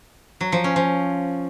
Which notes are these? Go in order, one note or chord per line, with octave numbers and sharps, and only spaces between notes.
F#3
F3
C#4
F3